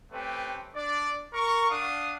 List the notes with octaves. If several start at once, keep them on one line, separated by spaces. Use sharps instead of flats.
A3 C4 C#4 G4 B4
D4 D5
A#4 C#6
D4 F5 F#5 D#6